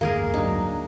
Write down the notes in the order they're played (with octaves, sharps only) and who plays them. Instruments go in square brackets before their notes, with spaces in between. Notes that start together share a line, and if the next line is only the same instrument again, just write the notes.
[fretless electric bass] F#1 D2 G#2 [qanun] A#3 G#4 A#4
[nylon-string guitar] F#3 D4 [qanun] D#4